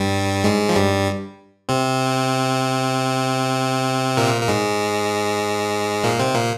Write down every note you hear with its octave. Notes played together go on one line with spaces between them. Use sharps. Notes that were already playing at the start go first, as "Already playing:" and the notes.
Already playing: G2 G3
G#2 G#3
F3
G2 G3
C3 C4
A#2 A#3
A#3
G#2 G#3
A#2 A#3
C3 C4
A#2 A#3